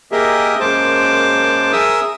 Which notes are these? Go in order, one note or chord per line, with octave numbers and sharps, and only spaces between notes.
A#3 G4 G#4 A#4 D#5 E5
F#2 G#3 A#3 C5 A5 D6
G#4 A#4 E5 D#6 E6